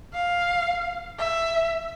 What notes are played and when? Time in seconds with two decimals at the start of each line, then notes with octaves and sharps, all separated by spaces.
0.14 F5
1.18 E5